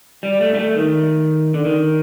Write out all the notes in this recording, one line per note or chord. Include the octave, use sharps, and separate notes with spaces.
G3
A3
G3
A3
D#3
D3
D#3